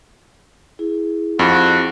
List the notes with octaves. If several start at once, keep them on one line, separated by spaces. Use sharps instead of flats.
E4 G#4
F2 F#4